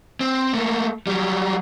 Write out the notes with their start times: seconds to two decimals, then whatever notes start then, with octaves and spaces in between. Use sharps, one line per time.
0.20 C4
0.54 A3 A#3
1.07 F#3 G3